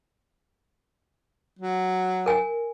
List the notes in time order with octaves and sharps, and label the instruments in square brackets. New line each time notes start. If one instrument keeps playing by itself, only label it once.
[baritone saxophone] F#3
[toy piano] A#4 G#5